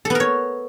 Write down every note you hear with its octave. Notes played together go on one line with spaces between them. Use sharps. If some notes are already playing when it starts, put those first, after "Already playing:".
B3 A4 A#4 C#5